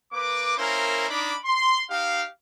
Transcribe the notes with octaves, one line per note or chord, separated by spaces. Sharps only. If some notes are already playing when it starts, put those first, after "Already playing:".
A#3 B4 D6
A#3 C#4 E4 A#4 C5
D4 D#4 B5 D6
C6
D#4 G4 F5